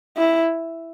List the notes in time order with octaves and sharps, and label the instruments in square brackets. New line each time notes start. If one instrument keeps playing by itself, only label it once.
[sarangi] E4